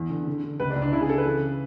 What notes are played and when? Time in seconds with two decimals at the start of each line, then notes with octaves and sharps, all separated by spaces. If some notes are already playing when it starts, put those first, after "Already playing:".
Already playing: E2
0.10 D3
0.27 D3
0.44 D3
0.60 C#2 B4
0.70 D4
0.76 C#2
0.82 D4
0.92 C#3 E4
1.01 G#4
1.08 C#3 A4
1.18 B4
1.26 E3